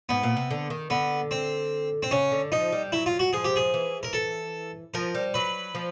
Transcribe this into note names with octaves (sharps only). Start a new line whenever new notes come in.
G#2 B3
A#2
C3
D3
D#3
D3 B3
C4
C4
C#3 C#4
D3
F3 D#4
G3
F#3 E4
F4
F#4
F3 G#4
G4
G#4
E3
A#4
A4
F3 A#4
G3
F#3 B4
F3